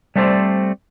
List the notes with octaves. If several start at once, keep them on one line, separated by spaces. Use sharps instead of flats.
G3 A3 C4 A4 C5 D5